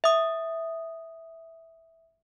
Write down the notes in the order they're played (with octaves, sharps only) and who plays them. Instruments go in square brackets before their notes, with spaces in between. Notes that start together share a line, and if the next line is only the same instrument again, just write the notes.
[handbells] E5 D#6